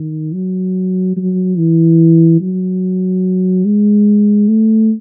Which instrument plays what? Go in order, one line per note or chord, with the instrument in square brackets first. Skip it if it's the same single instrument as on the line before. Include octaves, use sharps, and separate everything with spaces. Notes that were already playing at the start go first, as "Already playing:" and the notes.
Already playing: [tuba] D#3
F#3
F#3
E3
F#3
G#3
A3